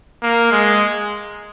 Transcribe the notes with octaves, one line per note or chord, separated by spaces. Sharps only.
A#3
G#3